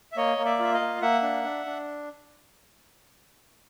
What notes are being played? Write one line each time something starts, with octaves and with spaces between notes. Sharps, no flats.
E5
A#3 C#5 D#5
A#3
D5 E5
F4 E5
D#5 F5
A#3
A#3 E5 F#5
D4
D4
D4